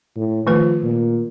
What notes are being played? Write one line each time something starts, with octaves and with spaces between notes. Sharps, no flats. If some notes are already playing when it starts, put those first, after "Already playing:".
A2
D#3 F3 A3 B4
A#2